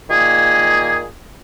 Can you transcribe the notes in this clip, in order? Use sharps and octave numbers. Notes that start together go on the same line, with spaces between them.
A#2 D#3 A#3 G#4